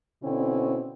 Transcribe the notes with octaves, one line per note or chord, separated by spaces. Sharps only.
B2 D3 C4 C#4 E4